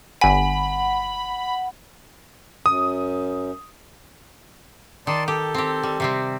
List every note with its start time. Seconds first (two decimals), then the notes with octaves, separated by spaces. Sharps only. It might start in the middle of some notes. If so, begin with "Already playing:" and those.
0.21 G1 F#5 G#5 B5 B6
2.66 F#2 D#6
5.07 D#3 D5 A5 C6
5.28 G4 A4
5.54 C4 G4
5.83 G3
6.00 C3 G3 C4